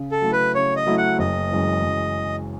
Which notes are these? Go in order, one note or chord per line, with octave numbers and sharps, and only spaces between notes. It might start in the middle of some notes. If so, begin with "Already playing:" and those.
Already playing: C#3
A4
F#3 A3 E4
B4
C#3 C#5
D#5
F#3 A3 E4
F#5
F#1 D#5
F#2 E3 G#3
F#1